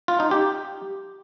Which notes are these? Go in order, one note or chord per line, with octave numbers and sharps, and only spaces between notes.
F4
D#4
G4